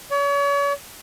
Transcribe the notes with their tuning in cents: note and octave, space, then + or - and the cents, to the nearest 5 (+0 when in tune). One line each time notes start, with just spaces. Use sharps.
C#5 +40